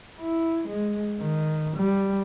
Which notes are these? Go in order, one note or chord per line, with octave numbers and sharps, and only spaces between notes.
E4
G#3
D#3
G3